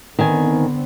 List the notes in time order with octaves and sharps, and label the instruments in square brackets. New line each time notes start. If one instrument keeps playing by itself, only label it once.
[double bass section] D3 B3 C4 [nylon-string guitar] D#3 G#5